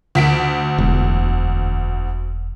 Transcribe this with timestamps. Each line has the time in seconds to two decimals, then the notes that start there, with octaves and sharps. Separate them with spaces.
0.15 D2 B6 D7
0.78 E1